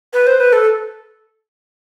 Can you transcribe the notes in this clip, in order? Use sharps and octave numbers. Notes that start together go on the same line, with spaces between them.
B4
C5
B4
A4